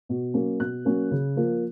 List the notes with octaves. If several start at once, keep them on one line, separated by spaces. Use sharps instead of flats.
B2
F#3 A#3 C#4
B2 F#6
F#3 A#3 C#4
C#3
F3 A#3